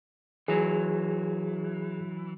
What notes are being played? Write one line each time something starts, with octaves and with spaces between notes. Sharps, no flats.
E3 F#3 G#4